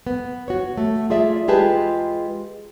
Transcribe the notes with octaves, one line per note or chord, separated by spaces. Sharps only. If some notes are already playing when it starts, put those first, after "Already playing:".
B3
F#4 C#5
A3
F4 G#4 D5 E5
G#3 F4 G4 G#4 B4 A5